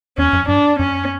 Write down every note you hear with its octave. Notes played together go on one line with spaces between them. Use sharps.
E2 C#4
F#2
G2 D4
F#2 C#4